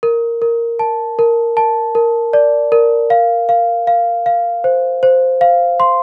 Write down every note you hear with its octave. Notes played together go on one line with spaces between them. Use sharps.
A#4
A#4
A5
A#4
A5
A#4
D5
A#4
F5
F5
F5
F5
C5
C5
F5
C6